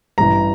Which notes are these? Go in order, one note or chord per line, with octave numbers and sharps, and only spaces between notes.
A1 G2 E3 A#5